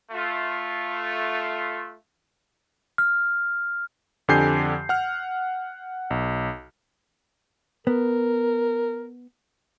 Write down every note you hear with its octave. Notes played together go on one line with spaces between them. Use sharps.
A3 F4
F6
F2 D3 G4 G#5 G6 C7
F#5 F6
B1
B3 A#4